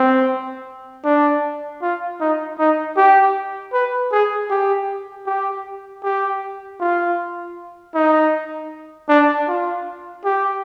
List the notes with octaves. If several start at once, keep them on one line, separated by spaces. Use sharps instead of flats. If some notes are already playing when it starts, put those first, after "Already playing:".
Already playing: C4
D4
F4
D#4
D#4
G4
B4
G#4
G4
G4
G4
F4
D#4
D4
F4
G4